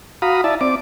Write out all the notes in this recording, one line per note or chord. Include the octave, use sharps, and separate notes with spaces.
F#4 F5 A#5 B5 D#6
E4 D5 E5 A5
C4 D5 D6